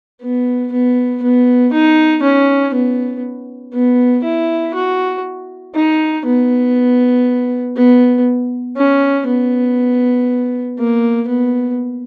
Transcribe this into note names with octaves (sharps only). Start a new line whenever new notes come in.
B3
B3
B3
D#4
C#4
B3
B3
E4
F#4
D#4
B3
B3
C#4
B3
A#3
B3